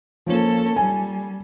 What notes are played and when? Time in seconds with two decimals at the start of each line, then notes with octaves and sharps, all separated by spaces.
0.26 F3 A#3 C#4 A4
0.76 G3 G#5